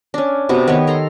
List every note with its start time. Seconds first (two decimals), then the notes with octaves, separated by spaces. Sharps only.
0.14 C#4 D4
0.49 C3 B3 F#4
0.68 D#3 B3 G4 C#5
0.87 A4 A#5 C6